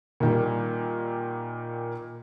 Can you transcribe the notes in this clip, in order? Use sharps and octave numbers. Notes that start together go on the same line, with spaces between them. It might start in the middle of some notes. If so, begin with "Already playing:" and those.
A#2 D#3 G3